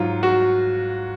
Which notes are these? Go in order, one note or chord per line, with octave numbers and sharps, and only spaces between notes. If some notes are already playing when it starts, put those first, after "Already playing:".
Already playing: G#2 F#3 F4
F#4